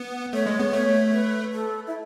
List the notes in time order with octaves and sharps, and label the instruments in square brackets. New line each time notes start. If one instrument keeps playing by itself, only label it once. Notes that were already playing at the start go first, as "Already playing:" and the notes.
Already playing: [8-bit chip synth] B3
[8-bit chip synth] A3 [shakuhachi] C#5
[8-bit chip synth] G#3
B3
[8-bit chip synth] A3 [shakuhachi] C#5
[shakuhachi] B4
A4
E4